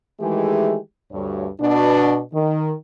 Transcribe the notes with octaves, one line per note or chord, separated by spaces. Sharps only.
D#3 E3 G#3 A3 G4 G#4
D2 G2 C#5
B2 D4
D#3